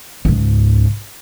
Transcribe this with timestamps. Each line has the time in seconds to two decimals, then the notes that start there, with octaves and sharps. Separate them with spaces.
0.25 C#2 G#2